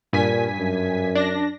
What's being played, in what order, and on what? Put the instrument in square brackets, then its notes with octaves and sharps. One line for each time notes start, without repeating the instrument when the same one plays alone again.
[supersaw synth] G2 G#5 B6 [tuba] A#2
[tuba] F#2
[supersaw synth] D4 A#6